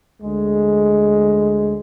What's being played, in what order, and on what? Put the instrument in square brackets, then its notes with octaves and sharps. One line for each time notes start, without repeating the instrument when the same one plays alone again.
[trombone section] D2 G#3